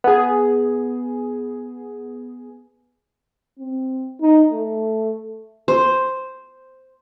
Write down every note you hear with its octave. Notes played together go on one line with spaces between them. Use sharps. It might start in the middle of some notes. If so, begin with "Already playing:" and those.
B3 G#4
C4
D#4
A3
C5